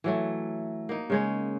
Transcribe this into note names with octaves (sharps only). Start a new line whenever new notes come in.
E3 F#3 A3
A#3 D#4
C#3 G#3 C#5